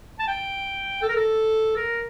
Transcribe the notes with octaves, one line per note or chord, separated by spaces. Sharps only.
A5
G5
A4
A#4
A4
A#4